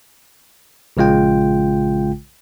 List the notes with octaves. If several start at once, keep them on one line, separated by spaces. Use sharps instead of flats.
A#1 C#3 G#3 F4 G5